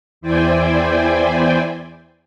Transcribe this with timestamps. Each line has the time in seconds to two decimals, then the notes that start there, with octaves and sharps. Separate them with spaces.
0.21 E2 E4 C5 D5 G5 G#5